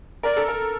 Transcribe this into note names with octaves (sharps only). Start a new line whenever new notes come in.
A#4 D5
A4
A#4